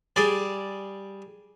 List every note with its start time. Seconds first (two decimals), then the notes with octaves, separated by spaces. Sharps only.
0.16 G3 G#4 D5